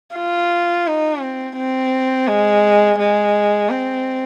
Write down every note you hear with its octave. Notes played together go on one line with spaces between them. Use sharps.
F4
D#4
C4
C4
G#3
G#3
C4